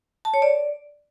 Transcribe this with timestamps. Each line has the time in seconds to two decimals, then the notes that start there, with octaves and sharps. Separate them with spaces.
0.25 A5
0.34 C#5
0.42 D5